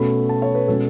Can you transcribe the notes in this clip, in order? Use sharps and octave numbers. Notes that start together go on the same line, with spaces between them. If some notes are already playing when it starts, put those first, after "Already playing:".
Already playing: B2 A3 C#4 B5
A5
C#5
B4
B2 G#3 C#4 A4